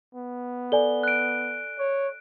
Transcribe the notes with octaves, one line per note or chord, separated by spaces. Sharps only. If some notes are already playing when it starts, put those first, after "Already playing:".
B3
A4 D5 G#5 G7
F#6 D7
C#5